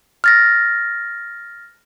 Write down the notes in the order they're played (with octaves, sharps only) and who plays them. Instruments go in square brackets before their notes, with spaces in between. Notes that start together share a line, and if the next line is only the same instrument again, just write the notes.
[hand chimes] F6 A6 A#6